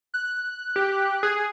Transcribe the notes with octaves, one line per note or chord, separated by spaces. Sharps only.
F#6
G4
G#4